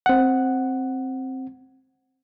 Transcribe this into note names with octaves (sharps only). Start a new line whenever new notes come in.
C4 F#5